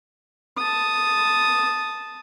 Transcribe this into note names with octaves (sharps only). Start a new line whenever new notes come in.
A5 D#6